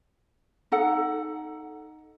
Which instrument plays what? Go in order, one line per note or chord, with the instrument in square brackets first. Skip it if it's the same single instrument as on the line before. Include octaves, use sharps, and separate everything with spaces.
[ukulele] D#4 A4 F#5